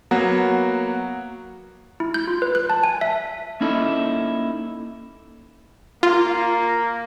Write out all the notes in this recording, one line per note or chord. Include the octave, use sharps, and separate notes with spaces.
F#3 A#3 B3 F#4
E4
G6
F4
B4
F#6
A5
G#5
E5
A#3 C#4 D#4 E4 A4
A#3 F4